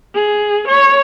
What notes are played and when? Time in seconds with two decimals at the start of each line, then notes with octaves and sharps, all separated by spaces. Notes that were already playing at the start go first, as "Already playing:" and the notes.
0.15 G#4
0.68 C#5